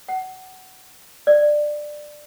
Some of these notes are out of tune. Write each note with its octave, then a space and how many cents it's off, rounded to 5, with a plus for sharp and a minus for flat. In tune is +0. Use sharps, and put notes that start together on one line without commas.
F#5 +20
D5 +15